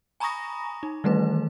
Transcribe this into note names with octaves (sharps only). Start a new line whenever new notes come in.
G#5 A#5 B5 C#6 D#6 A#6
D#4
D#3 E3 G3 A3 B4